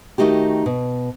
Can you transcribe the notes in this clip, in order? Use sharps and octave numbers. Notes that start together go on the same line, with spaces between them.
D#3 A3 D#4 F#4 G4
B2